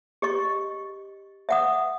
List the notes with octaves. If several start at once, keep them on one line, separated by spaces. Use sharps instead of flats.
G4 D#5 C#6
E5 F#5 D#6